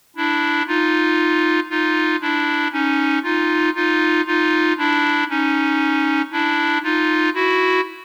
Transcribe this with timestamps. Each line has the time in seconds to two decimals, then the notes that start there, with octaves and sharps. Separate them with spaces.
0.16 D4 E4
0.67 D#4 F4
1.70 D#4 F4
2.21 D4 E4
2.72 C#4 D#4
3.23 D#4 F4
3.75 D#4 F4
4.27 D#4 F4
4.78 D4 E4
5.29 C#4 D#4
6.32 D4 E4
6.83 D#4 F4
7.34 E4 F#4